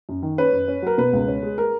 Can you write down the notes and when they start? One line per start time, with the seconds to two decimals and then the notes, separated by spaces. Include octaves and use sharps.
0.09 F#2
0.23 D#3
0.38 C#4 B4
0.53 F#2
0.68 C#4
0.82 F#3 A#4
0.98 B2 B4
1.13 C#2
1.28 C#4
1.43 G#3
1.58 G#3 A#4